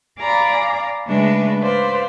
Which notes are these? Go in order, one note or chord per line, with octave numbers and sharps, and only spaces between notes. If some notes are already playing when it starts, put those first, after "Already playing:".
D5 F5 G#5 A#5 B5 D6
C#3 G#3 A3 D4 B4 E5
B4 C5 D5 F5